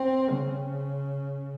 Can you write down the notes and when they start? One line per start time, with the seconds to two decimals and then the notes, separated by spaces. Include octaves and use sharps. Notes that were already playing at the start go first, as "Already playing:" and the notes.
Already playing: C4
0.30 C#3